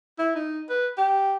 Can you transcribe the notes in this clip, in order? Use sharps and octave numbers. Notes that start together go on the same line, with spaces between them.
E4
D#4
B4
G4